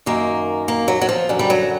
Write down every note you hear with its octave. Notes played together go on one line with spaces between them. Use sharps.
F#2 D#3 A#3
A#3
F#3
F#3
F3
F#2 D3
G3
F#3